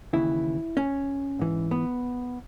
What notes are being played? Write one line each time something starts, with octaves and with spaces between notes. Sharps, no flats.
D#2 C#3 E3 E4
C#4
G#2 E3
B3